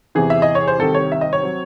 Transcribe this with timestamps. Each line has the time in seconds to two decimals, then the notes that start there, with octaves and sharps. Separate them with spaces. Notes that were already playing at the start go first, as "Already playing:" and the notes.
0.15 E2 C3 E3 G#4
0.30 E5
0.42 D#5
0.55 C#5
0.68 C5
0.79 C2 C3 D#3 A4
0.95 C#5
1.12 E5
1.21 D#5
1.33 C#5
1.43 F#3 C4